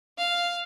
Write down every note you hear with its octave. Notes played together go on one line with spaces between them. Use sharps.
F5